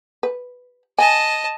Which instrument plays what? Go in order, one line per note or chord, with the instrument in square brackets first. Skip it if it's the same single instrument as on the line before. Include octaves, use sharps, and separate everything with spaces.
[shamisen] B4
[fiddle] D#5 A5 [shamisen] G#5